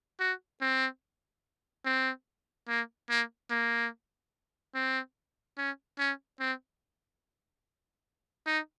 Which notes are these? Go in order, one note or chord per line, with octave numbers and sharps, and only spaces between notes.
F#4
C4
C4
A#3
A#3
A#3
C4
C#4
C#4
C4
D#4